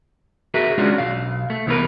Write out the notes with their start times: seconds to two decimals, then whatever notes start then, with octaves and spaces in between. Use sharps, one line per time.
0.54 F#4 G#4 A#4 B4 E5
0.78 G#3 C#4 D4 F4 F#4
0.98 B1 C3 F5
1.50 A3
1.67 C2 E3 B3 C#4 A#4 B4